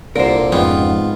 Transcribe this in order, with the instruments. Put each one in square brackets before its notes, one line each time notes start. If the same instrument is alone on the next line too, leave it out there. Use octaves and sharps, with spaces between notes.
[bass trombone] C2 [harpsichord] A#2 D3 [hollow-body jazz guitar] A#4 C5
[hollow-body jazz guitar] F2 C#3 [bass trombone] G#2 [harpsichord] B3 F4